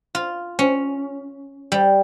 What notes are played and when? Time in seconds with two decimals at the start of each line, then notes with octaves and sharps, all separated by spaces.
0.15 F4
0.59 C#4
1.72 G3